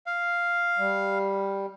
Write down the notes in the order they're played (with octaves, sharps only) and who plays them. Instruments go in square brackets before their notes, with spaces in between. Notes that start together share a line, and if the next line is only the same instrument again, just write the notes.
[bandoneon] F5
[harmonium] G3